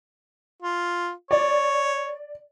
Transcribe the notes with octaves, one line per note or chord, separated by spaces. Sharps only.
F4
C#5 D5